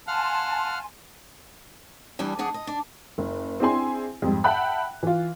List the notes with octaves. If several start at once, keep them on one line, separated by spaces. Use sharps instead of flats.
F5 F#5 G#5 A5 C6 F6
E2 E3 G3 D4
F2 D4 G#4 F#5
D#5
D4
F#1
C4 D4 E4 G#4 G#5 C6
F2 G#2 G3
E5 F#5 G5 A5 B5 F#6
E3 F4